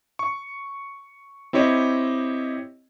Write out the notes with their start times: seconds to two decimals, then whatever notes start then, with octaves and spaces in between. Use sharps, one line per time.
0.19 C#6
1.53 C4 E4 G4 C#5 D#5